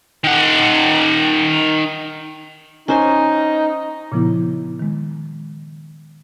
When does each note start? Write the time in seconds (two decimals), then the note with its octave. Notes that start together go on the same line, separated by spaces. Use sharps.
0.24 D#3 F#5
2.88 C#4 D#4 C5 G#5
4.12 A#2 C#3 F3 B3 E4
4.79 D#3 G#3